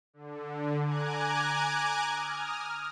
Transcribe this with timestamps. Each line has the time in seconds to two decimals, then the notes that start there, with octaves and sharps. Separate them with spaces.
0.14 D3
0.82 G#5 A#5 D6 F#6 G#6
2.12 D#6 F6